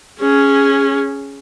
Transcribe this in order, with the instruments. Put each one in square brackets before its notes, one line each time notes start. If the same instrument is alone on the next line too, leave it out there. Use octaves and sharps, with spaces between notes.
[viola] C#4 G#4